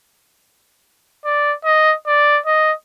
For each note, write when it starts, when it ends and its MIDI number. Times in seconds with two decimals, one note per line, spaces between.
1.25 1.54 74
1.64 1.94 75
2.07 2.39 74
2.46 2.72 75